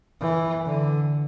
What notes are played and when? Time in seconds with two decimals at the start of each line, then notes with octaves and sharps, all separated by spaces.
0.20 E3
0.66 D3